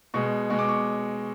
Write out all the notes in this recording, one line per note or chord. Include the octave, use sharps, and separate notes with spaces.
B2 G#3 C#6
B2 G#3 C#6
D6
C#6